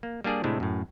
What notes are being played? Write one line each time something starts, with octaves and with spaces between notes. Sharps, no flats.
A#3
G3 A#3 D4 G#4 D5
A2 C3 G#3 A3 D4 E4
F#2 A2